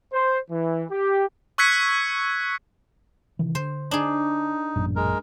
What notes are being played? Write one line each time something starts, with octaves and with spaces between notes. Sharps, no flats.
C5
E3
G4
C#6 E6 F#6 G#6 B6 C#7
C3 D#3 E3
D3 C5
D4 D#4 G#4
A1 F#2 A#2
G#3 A#4